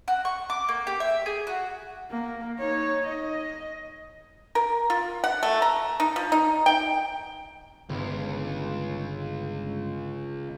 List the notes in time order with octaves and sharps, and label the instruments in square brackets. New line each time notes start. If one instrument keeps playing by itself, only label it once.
[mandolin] F#4
C#6
D6
A#3
G4
E5
G#4
F#4
[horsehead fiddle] A#3
D#4 C#5
D#5
[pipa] A#4
F4
F#5
A3
A#5
D#4
F3
D#4
G5
[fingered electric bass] G1 [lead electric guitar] C#2